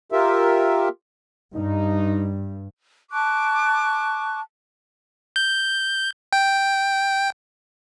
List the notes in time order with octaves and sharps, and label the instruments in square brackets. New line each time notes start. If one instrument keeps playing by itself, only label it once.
[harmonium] F4 G4 A#4 E5
[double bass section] G2 [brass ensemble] D#4
[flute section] A5 C#6 D6 F#6
[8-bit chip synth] G6
G5